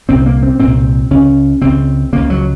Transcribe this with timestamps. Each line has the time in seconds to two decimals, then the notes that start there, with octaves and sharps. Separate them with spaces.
0.08 C2 A#2 C4
0.26 A#3
0.43 C4
0.60 C2 A#2 C4
1.11 C#2 C#3 C#4
1.61 C#2 C#3 C4
2.13 C#2 C#3 A#3
2.30 F#3